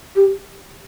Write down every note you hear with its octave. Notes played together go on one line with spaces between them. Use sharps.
G4